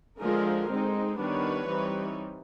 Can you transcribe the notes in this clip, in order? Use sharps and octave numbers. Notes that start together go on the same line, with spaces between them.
D3 F3 G#3 G#4 A#4
G#3 C4 D#4
D#3 G3 B3 D4 B4 C#5
E3 G3 C4 D#4